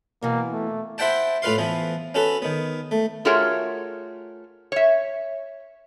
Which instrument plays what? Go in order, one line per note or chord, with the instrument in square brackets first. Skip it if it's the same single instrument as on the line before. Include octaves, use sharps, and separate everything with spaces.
[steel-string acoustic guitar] B2 E3 [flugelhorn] A#3
[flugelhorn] A3
[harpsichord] E4 C5 E5 F#5 G5 A5
A2 F4 B4 F5 C6
E3 F3 B3
C#4 F#4 A4 B4
D#3 B3
A3
[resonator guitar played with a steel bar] A3 F4 F#4 G#4 A#4 C#5
C#5 E5